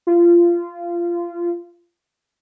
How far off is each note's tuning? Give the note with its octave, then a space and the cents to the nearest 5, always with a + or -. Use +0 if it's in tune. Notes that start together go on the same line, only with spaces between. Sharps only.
F4 -20